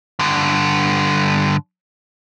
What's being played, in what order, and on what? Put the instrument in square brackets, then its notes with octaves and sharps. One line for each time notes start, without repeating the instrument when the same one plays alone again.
[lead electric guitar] G2 D3